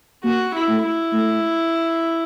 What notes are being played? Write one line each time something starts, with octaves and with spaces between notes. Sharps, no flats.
A#3 F#4
E4
A3
E4
A3